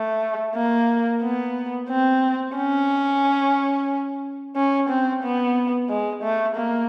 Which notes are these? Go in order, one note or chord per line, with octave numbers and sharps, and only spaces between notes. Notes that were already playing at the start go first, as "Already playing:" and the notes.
Already playing: A3
A#3
B3
C4
C#4
C#4
C4
B3
G#3
A3
A#3